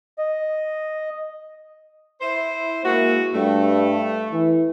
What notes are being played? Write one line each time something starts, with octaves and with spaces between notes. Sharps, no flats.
D#5
E4 C5
G#3 A#3 E4 F#4
G2 A3
E3